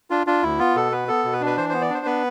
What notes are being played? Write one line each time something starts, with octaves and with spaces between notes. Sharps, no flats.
D4 F4
D4 F4
D2 E4
B3 F4
B2 A4
B3 B4
B3 A4
B2
B4
D4
B4
E3 C5
B3 C5
D5
D4 C5
B3 B4